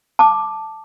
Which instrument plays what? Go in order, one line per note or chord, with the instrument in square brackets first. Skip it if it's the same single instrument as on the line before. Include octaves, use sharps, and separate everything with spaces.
[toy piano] A5 D6